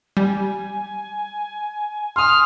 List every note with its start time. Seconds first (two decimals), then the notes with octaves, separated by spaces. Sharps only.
0.17 G3 G#5
2.16 C6 D#6 F6